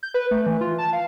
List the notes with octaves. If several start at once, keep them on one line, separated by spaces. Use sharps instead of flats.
G6
B4
A3
E3
F4
A5
F5